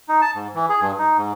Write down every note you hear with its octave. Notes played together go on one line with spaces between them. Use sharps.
D#4
A5
G#2
E3
G#4
G2
D#4
G#2